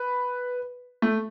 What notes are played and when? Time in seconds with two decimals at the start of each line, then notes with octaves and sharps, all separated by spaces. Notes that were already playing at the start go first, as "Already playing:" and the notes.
Already playing: B4
1.02 A3